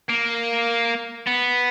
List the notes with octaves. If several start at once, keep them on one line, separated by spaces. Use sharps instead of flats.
A#3
B3